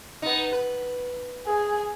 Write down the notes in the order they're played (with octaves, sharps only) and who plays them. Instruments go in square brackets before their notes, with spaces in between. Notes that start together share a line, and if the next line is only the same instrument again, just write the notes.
[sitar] B3 D#4
B4
[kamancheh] G#4